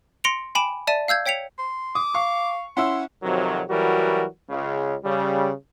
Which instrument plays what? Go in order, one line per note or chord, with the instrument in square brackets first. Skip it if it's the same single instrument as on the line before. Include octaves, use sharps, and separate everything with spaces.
[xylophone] C6 A#6 C#7 D7 F7
G5 G#5 B5 D6 D7 E7
D5 E5 A5 A6 D#7
F5 E6 G6 G#6
C#5 G5 B6 C#7 F7
[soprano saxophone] C6
[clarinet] D6 [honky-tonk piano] D#6
[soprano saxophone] F5 [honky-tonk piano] C#6
[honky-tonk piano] C#4 E4 E6 [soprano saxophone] F#5 [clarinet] C6
[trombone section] F2 C3 D#3 F#3
E3 F#3 G3 F#4 A#4
C#2 C#3
C#3 G3